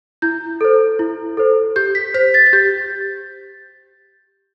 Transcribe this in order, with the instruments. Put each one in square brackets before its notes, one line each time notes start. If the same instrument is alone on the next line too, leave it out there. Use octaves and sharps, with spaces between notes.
[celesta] E4 G6
A4 C5
E4
A4 C5
G4 G6
B6
C5 B6
A6
A6
G4 G6